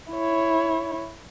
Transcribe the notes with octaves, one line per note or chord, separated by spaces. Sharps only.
E4 C#5